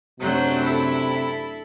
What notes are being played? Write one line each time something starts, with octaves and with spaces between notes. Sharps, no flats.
F#2 C3 F#3 A3 D4 C5
E4 A4